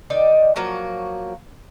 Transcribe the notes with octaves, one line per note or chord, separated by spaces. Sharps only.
D#3 D#4 D5 G5
F3 F#3 A#3 F#4